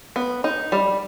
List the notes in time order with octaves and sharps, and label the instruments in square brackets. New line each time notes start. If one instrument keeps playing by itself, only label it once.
[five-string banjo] B3
D#4
G3